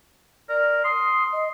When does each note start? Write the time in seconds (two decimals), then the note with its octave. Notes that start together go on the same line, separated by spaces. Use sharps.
0.49 A#4 D5
0.84 C6 D#6
1.33 D#5